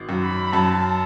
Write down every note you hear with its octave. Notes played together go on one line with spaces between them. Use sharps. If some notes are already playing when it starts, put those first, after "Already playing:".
Already playing: G#1
F#2
B5
F#2 A5